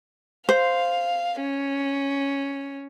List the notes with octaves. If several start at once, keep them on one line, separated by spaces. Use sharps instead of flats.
C5 F5
C#4